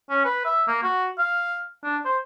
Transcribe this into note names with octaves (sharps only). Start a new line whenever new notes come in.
C#4
B4
E5
A#3
F#4
F5
D4
C5